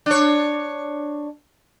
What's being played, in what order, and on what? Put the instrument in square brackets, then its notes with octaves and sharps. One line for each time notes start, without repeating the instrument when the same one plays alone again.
[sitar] D4 C#5